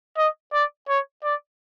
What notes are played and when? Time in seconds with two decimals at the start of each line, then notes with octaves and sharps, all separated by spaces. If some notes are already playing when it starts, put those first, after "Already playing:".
0.17 D#5
0.53 D5
0.88 C#5
1.24 D5